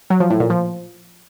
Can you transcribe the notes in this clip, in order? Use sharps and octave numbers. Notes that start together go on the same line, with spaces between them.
F#3
F3
A2
A#2
F3